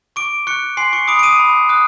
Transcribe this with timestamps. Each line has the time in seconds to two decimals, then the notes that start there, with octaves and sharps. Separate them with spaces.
0.16 C#6 D6 D7
0.47 C#6 F#6 C#7
0.77 G#5 C6 C7
0.93 C#6 C#7
1.08 B5 D6 D#6 D7
1.19 D7
1.23 D#6 D#7
1.39 B5
1.69 D#6 F#6